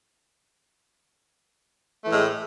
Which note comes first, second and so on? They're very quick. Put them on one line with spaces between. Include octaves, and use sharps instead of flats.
A3 E3 A2 G#3